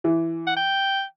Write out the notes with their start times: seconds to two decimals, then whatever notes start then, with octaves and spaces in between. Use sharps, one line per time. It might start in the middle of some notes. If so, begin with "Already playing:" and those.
0.04 E3
0.47 F#5
0.57 G5